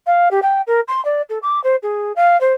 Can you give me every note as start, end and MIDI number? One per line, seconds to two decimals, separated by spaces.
0.06 0.29 77
0.31 0.40 67
0.42 0.61 79
0.67 0.80 70
0.88 1.03 84
1.05 1.22 74
1.29 1.38 69
1.42 1.62 86
1.63 1.76 72
1.83 2.12 68
2.16 2.39 77
2.40 2.53 72